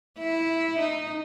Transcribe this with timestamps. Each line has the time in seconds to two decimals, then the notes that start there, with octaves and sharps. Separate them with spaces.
0.18 E4
0.79 D#4